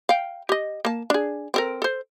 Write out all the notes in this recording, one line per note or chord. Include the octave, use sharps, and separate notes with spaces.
F5 G5
G4 D#5
A#3 A5
D4 G#4
C4 A4 A#4
A4 C5